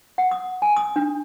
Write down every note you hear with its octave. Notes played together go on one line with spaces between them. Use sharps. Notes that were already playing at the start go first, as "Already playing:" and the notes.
F#5
D#6
G#5
D#6
D4